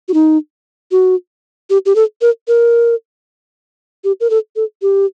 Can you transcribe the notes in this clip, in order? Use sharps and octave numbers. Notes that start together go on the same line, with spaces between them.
F#4
D#4
F#4
G4
G4
A4
A#4
A#4
G4
A#4
A4
A4
G4